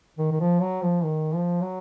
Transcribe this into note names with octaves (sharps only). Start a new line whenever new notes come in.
D#3
D#3
F3
F#3
F3
D#3
F3
F#3